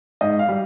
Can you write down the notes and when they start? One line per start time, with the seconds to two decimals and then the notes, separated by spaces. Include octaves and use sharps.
0.21 G#2 D#5
0.39 F5
0.48 G3